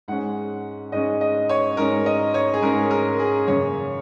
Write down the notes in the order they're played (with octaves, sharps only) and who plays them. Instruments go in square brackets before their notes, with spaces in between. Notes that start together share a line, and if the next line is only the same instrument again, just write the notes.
[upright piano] G#2 G#3 C#4 F#5
G#2 G#3 C#4 D#5
D#5
C#5
G#2 G#3 C#4 A#4
D#5
C#5
G#4
G#2 G#3 C#4 A#4
A#4
G#4
F#2 C#3 A#3 C#4 C#5